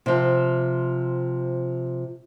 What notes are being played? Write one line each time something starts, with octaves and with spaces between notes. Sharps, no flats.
C3 F3